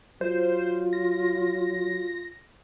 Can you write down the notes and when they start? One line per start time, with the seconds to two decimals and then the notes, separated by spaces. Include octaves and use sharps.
0.21 F#3 F4 C5
0.93 A#6